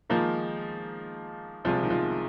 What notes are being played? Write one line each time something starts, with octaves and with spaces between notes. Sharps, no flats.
D#3 F3 G#3 A#3 D#4
C2 C3 F3 G#3 F4
D#3
F3